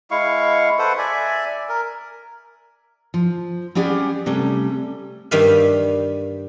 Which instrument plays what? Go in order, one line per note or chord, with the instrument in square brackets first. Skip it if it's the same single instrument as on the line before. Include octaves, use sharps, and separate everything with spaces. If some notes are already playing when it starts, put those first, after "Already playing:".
[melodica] G#3 E4 F5 C#6
A4 B4 C5 F#5
D5 E5 G#5
A#4
[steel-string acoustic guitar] F3
G3 C#4 G4 G#4 D5 F#5
C3 G3 A3 C#4
[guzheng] G2 D#3 G3 D5 E5 F5